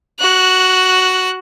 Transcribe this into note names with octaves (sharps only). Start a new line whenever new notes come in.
F#4 F#6